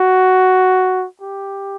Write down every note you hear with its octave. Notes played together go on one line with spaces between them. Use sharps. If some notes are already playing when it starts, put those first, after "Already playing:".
Already playing: F#4
G4